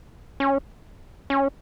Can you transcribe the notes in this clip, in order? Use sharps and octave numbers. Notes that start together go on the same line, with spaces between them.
C#4
C#4